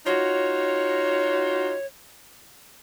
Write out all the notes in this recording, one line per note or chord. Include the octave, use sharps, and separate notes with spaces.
D#4 F4 F#4 C#5